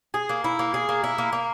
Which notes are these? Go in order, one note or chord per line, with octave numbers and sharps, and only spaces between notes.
G#4
A#3
E4
A#3
G#4
A#3
E4
A#3
A#3